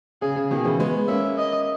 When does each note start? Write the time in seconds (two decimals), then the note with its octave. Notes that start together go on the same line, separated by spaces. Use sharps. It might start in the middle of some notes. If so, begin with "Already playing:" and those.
0.22 C#3 G#4
0.36 C#3
0.51 B2 D#3 G#4
0.65 C#3 E3
0.80 G#3 B3
1.08 A#3 C#4 E5
1.38 D#5